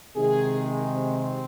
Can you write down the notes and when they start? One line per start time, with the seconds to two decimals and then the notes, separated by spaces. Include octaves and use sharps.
0.16 C3 D#3 G#3 G#4
0.93 C4